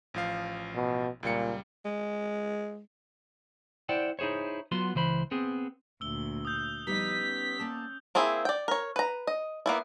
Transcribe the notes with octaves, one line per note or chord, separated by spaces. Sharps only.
A1 F3 F5
B2
C#2 A#2 G3 C#7
G#3
E4 C5 D5 F#5 G5
D#4 E4 G#4 C5 C#5
F#3 B3 F4 F#4 C6
C#2 E3 C5 B5
B3 C4 G#4
D2 A#2 E6 G7
D#6 G6
F3 G3 B3 D#4 D#5 B6
C#4
A#3 D5 A5
A#3 C4 E4 G#4
D5 G5
A#4 C#5
B4 A#5
D#5
A#3 B3 E4